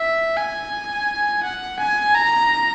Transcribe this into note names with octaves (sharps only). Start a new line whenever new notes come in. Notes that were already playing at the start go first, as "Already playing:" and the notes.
Already playing: E5
G#5
F#5
G#5
A#5